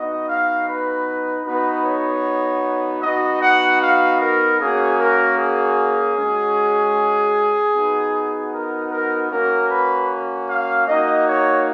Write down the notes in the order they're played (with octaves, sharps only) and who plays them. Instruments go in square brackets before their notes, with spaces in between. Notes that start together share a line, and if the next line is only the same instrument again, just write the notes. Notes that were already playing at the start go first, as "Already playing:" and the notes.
Already playing: [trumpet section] B3 D#4 F#4 D#5
F5
B4
B3 D#4 F#4 B4
C#5
B3 D#4 F#4 D#5
F#5
F5
A#4
A#3 C#4 F#4 G#4
A#4
G#4
G#3 C#4 F#4
B3 D#4 F#4
A#4
A#4
A#3 C#4 F#4 A#4
B4
F5
A#3 D#4 F#4 D#5
C#5